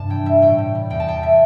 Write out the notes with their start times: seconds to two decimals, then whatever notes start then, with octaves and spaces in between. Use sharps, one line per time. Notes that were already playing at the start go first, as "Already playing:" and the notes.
Already playing: G2 C3 G3 A5
0.10 E3 G5
0.26 G3 E5
0.42 A2 G5
0.58 A2
0.75 G3
0.90 E2 G5
1.00 A5
1.07 E2 G5
1.23 E5